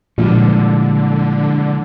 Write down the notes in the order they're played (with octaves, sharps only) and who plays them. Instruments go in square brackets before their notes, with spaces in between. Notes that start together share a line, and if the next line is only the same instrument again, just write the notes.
[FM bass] A#2 [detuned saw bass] D3 [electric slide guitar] F3 G3 [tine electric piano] G#3 A#3 E4